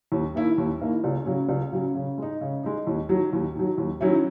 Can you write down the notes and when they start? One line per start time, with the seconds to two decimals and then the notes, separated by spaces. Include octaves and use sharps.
0.12 D#2
0.35 D#3 A#3 E4
0.58 D#2
0.80 D#3 A#3 E4
1.04 C#2
1.25 C#3 F#3 C#4
1.49 C#2
1.72 C#3 F#3 C#4
1.95 C#3
2.18 G#3 D#4
2.41 C#3
2.63 G#3 D#4
2.87 D#2
3.09 D#3 F#3
3.33 D#2
3.56 D#3 F#3
3.78 D#2
4.01 D#3 F#3 C#4 E4